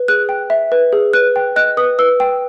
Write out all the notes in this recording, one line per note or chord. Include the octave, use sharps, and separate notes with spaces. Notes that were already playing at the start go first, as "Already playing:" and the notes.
Already playing: B4
G#4 F#6
G5
E5
B4
G#4
B4 F#6
G5
D#5 F#6
B4 D#6
B4 E6
G5